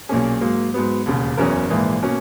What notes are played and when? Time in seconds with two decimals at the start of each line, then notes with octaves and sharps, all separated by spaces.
0.09 B1 A#2 A#3 C#4 G#4
0.41 G#2 F#3 A#3
0.74 G#2 F#3 B3
1.06 E1 D#2 C#3
1.37 F#1 E2 C#3 F#3 C#4 A#4
1.70 A#1 G#2 E3 A#3
2.02 B2 A#3 C#4